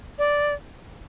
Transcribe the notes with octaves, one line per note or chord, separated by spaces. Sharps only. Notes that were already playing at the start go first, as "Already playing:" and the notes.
D5